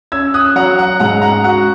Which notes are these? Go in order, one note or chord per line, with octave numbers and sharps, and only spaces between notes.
C#4 E6 G#6
D#6 F#6
F#3 F#5 A#5
F#5
G#2 F#5 A#5
F#5 A#5
F#4 F#5